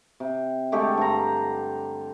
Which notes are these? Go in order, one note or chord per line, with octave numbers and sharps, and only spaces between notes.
C3
D3 G#3 A3 G4
G2 C5 A#5